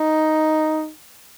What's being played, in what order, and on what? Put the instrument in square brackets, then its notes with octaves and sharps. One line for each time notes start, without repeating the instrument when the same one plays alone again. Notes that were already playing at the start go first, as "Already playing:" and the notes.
Already playing: [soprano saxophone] D#4